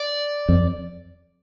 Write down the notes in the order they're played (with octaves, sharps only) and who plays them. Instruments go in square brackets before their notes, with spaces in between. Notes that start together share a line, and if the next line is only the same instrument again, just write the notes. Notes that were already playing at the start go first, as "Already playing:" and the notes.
Already playing: [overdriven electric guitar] D5
[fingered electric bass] F2